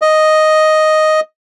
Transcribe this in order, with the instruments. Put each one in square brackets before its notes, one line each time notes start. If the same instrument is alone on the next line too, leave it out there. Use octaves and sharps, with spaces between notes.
[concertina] D#5